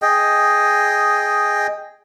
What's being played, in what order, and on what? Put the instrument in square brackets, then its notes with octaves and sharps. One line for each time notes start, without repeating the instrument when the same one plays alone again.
[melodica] G#4 D#5 G5